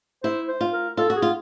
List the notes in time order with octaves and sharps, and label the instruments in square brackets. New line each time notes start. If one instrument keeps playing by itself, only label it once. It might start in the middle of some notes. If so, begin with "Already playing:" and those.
[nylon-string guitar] E4 [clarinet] C5
[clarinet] C5
[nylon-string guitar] F4
[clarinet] A#4
[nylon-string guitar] F4 [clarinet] A4
[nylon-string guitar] F#4
[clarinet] G#4
[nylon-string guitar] F4